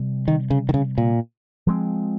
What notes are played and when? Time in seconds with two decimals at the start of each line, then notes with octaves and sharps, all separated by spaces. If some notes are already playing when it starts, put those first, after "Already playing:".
Already playing: C3 G3 C4
0.28 D#3
0.50 C#3
0.69 D#3
0.74 C#3
0.98 A#2
1.67 F3 G#3 C4